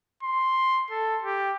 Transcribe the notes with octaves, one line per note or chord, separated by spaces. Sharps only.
C6
A4
G4